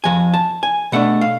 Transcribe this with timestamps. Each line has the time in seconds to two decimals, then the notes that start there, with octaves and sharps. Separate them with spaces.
0.04 F2 F3 G#5
0.34 A5
0.63 G#5
0.92 B2 A3 D4 F#5
1.21 F5